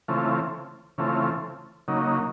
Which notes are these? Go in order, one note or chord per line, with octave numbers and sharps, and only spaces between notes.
C#3 E3 A3 C4 F4
C#3 E3 A3 C4 F4
C#3 F#3 A#3 D#4